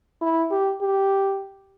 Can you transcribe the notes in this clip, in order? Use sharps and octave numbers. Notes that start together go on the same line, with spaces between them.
E4
G4
G4